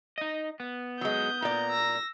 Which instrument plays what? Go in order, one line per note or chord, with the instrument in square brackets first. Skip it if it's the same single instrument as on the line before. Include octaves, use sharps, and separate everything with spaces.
[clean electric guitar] D#4 D#5
B3
[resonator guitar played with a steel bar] F#3 G#3 [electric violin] D#6 G6
[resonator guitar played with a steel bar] A#2 D5 [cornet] A#5
[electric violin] E6 A#6